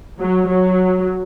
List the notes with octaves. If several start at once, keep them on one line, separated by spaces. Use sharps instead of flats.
F#3
F#3